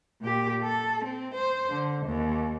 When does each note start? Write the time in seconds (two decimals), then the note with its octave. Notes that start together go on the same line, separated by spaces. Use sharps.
0.21 A#2 G4
0.63 A4
1.04 C4
1.34 C5
1.70 D3
2.06 D#2